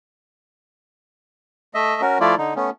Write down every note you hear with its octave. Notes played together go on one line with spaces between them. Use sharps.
A3 D#5 E5
C#4 F#4 A#4
F3 A3 E4 F4 D5
D3 D#4
A3 B3 C#4